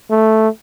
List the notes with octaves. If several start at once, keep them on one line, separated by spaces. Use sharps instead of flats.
A3